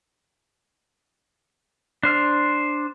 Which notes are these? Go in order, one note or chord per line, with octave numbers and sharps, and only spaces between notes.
D4 C5 F6